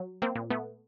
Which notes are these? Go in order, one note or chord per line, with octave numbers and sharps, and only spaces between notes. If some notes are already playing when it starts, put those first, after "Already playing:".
Already playing: F#3
A#3 C4
A#2
A3 B3